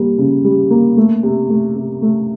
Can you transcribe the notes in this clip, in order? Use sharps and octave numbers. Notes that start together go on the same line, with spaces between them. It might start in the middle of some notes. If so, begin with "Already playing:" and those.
Already playing: G3 A#3
C#3
G3
A#3
A3
C3
A3
C3
A3